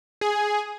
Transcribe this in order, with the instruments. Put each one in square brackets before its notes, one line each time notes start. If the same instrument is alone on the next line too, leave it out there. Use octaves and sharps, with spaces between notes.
[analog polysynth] G#4